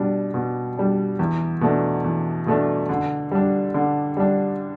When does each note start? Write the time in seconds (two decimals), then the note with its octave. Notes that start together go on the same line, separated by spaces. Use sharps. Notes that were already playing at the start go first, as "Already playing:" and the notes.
Already playing: B2 G3 D4
0.34 B2
0.77 G3 D4
1.19 E2
1.61 B2 A3 D4
2.04 E2
2.46 B2 A3 D4
2.89 D3
3.31 G3 D4
3.74 D3
4.17 G3 D4